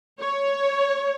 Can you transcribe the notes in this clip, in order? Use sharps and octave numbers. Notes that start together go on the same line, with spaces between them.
C#5